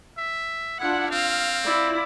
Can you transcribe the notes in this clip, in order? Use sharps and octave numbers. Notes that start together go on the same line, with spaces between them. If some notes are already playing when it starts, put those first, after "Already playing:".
E5
D4 E4 F4 F#5
C4 F5
E4 F4 D5